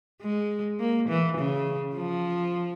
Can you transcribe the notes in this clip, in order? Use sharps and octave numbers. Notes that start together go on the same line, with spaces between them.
G#3
A#3
E3
C#3
F3